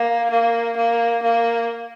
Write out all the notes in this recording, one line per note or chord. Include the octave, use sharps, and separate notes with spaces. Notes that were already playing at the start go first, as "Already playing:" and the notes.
Already playing: A#3
A#3
A#3
A#3